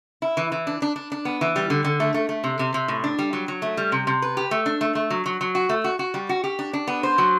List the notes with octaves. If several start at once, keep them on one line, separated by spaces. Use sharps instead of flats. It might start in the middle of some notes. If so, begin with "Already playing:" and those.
E4
E3
E3
D4
D4
D4
D4
B3
E3
G3
D3
D3
A3
A3
A3
C3
C3
C3
A2
D4
G3
F#3
F#3
A3
G3
C3
C3
B4
G4
A3
D4
A3
A3
F#3
F#3
F#3
F#4
A3
F#4
F#4
G3
F#4
G4
D4
D4
B3
C5
F#3